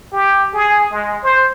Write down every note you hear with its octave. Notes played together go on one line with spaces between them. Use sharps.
G4
G#4
G#3
C5